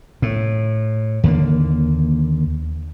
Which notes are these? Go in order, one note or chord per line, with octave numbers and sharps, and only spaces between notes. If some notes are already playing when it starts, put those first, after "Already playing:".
A2
D#2 D3 A#3